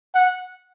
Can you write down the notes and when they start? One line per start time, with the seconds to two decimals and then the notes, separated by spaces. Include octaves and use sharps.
0.15 F#5